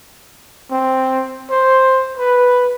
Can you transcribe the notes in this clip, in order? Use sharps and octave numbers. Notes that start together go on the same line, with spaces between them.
C4
C5
B4